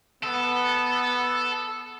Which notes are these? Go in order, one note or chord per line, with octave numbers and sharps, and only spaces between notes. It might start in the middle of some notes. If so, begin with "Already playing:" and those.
B3 A4